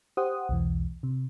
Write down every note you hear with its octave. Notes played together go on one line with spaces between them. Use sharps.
G4 C5 F#5 D#6
B1 E2 E3
C3